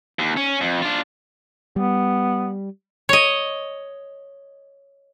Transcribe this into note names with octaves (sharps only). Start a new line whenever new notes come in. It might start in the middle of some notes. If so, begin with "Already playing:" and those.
D#2
C#4
F2
D4 F4
G3 B3
C#5 D#5